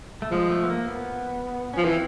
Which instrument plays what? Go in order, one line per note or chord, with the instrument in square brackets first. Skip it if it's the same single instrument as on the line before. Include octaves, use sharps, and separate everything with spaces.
[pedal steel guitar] A3
[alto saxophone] F3 [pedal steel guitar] G#3
[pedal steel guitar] A3
B3
A#3
B3
[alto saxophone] F3 [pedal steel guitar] C#4
[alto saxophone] E3 [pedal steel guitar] C4